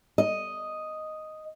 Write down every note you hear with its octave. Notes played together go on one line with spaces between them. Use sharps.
D#5